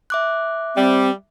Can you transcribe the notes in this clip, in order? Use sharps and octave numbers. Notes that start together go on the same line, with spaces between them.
E5 D6 F#6
G3 C4